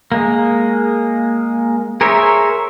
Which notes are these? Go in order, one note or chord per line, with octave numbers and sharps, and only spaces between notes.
G#3 A#3
G#4 A#4 C5 C#5 E5